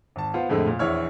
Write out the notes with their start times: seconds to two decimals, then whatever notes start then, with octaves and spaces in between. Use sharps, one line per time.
0.16 G#1 A5
0.34 B3 F4 C5
0.49 F2 A2 D3 G#3 A3 E4
0.67 A#2
0.79 A#1 E2 E4 C#5 F6